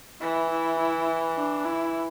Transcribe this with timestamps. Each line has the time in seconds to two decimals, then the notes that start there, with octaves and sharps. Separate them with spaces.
0.21 E3 E4
0.50 E4
0.79 E4
1.36 D4
1.65 E4